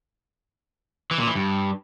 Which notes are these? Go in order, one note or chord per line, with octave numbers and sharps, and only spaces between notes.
E3
A#2
E3
G2